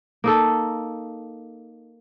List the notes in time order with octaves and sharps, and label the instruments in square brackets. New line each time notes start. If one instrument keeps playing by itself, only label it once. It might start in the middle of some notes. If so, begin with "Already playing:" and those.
[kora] A#3 D#4 A4